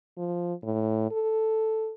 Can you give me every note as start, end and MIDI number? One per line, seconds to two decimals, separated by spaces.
0.17 0.54 53
0.63 1.10 45
1.11 1.93 69